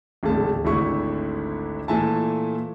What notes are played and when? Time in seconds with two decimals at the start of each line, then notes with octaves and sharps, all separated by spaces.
0.23 D1 G#1 C#3 A3 A5
0.65 G#1 D2 D3 A3 E4 C#6
1.88 A#2 E3 A3 E5 G#5 A5